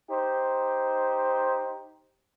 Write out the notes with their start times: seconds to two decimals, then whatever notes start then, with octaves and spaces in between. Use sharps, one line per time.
0.10 D#4 G4 C5